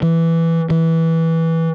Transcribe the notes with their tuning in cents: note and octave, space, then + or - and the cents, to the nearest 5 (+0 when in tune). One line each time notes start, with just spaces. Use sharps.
E3 +5
E3 -15